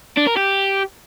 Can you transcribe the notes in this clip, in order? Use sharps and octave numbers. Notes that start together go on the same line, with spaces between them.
D4
A#4
G4